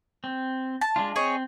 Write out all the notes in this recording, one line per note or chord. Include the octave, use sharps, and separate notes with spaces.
C4
A5
G#3 D4 F4
C4 G#4 C#5 D#5